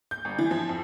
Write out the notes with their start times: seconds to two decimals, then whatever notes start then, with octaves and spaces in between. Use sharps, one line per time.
0.11 G6
0.25 G1
0.39 E3
0.51 F3
0.69 F2